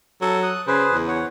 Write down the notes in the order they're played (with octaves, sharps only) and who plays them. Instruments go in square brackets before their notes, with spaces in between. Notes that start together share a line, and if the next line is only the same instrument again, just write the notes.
[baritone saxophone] F#3 [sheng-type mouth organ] A4
[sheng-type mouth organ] D#6 F#6
[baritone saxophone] C#3 [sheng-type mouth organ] G#4 B4 C5
[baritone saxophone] E2
[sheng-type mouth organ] C#5 F#5